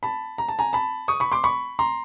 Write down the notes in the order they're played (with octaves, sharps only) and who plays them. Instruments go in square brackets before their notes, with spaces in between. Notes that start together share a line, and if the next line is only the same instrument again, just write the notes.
[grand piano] A5 B5
A#5
A5
G#5 A#5
A5 B5
C#6 D#6
B5 C#6
C6 D6
B5 C#6
A#5 C6